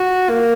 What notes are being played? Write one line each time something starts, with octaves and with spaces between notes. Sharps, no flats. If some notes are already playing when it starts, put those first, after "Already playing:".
Already playing: F#4
A#3